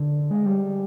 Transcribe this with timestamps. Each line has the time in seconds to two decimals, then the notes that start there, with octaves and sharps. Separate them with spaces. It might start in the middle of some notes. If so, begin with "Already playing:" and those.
Already playing: D3
0.31 G#3
0.46 G3